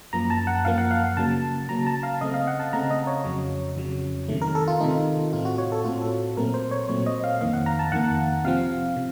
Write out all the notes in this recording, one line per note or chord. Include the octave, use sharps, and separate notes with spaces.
F#2 F3 A#3 A#5
A5
F#5
F#2 F3 A#3 F5
F#5
F5
F#5
C#3 F#3 A#3 A5
C#3 F#3 A#3 A#5
A5
F5
C#3 A3 C4 D#5
F5
F#5
A5
C#3 A3 C4 A#5
D#5
C#5
F2 C#3 F#3
F2 C#3 F#3
C3 D#3 A3
A#4
A4
F4
C3 D#3 A3 D#4
A2 A3 C4 F4
F#4
C#5
A4
A2 A3 C4 F4
A4
A#2 F#3 A3 C4 A#4
C5
C#5
A#2 F#3 A3 C4 C#5
D#5
F5
F2 D#3 A#3 F5
F#5
A#5
A5
F2 D#3 A#3 F#5
C3 F3 C4 F5
C3